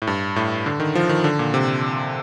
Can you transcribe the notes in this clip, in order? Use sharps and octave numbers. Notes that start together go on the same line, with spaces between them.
A2
G2
A2
D3
D#3
F3
D#3
D3
A#2
C3